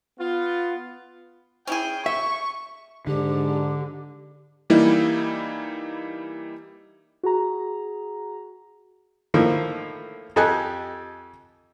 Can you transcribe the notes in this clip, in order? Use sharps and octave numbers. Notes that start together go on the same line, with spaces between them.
B3 F4
C#4 E4 G#4 G5
E5 C#6
G#2 D3 D4 G4
E3 G3 A#3 D#4 E4
F#4 G#4 A#5
A2 D#3 F3 A3 A#3
F2 G4 A4 D#5 G#5 F#6